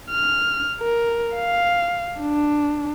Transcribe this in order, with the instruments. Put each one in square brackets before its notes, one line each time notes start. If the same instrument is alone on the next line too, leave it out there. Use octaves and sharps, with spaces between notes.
[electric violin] F6
A#4
F5
D4